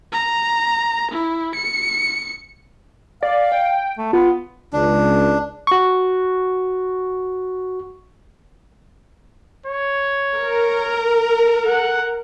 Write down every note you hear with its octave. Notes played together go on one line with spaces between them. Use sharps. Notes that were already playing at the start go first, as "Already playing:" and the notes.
A#5
E4
C#7
D5 F5
G5
A3
B3 F4
C#2 D4
F#4 C#6
C#5
A#4
F#5